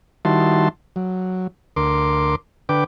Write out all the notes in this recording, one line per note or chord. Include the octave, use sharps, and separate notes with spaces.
D#3 G3 E4 F#4 A5 C6
F#3
D2 A#4 C6 D6
D3 B4 G5 D6